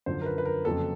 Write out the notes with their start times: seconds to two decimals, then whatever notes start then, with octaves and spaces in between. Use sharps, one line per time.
0.06 F#2 D3 F3 C5
0.21 A#4
0.26 B4
0.38 B4
0.45 A#4
0.65 F2 C#3 F#3 A#3 A4